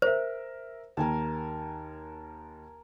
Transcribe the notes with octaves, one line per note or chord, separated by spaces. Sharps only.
A#4 C5 E5
D#2 A#4 G#5 A5